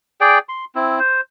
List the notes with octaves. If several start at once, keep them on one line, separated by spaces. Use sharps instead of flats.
G#4 D5 G5
C6
C4 E4
C5